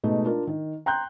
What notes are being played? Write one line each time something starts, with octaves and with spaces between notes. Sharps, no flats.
B2 G#3 A3 D#4
D4 F4 A#4
D#3
G5 A#5 C6 F#6 G6